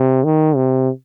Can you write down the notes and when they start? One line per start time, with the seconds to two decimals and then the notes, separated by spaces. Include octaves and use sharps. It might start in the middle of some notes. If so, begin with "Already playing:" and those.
Already playing: C3
0.24 D#3
0.56 C3